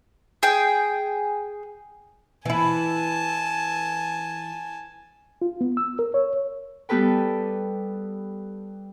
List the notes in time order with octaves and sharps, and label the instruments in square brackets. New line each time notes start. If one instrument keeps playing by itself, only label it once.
[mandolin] G#4 G5
[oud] E3 E4 [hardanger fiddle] G#5 A5
[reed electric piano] F4
B3
E6
A#4
C#5
[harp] G3 B3 G4 A4 B4 G5